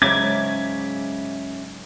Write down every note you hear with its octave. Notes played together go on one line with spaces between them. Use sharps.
G#2 C#3 F#3 C#4 E5 D6 G#6